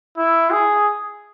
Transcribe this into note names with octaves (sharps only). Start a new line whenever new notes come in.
E4
G#4